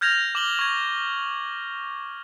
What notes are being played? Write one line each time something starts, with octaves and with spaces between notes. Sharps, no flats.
F6 G6 G#6 A#6 F7
D6 G6 F#7 G7
C#6 G#6